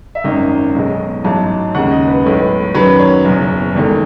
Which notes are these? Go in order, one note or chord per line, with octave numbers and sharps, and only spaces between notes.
E5
G#1 F#2 D#3 D#5
B1 B2 G#3
A1 G#2 F#3 A5
D#2 C#3 G#3 F#5
D#5
B4
B1 A2 G#3
B4
F#2 D#3 F#3 B4
C#5
F#1 E2 B2
E1 E2 D#3 A3